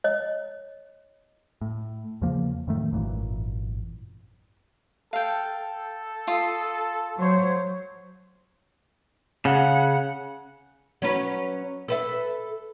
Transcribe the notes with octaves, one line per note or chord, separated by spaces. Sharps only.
C#5 D#5
A2
E2 C#3 F3 A#3
F#2 A2 D#3 A3
G#1 F#2 A#2 E3
A4 F5 G5
A4
F4 D#6
F#3 C5 C#5
C#3 F#5
F#3 C#4 B4
A4 B4 E5